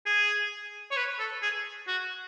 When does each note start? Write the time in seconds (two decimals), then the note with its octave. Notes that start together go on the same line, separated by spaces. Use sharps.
0.06 G#4
0.91 C#5
0.97 B4
1.19 A4
1.42 G#4
1.88 F#4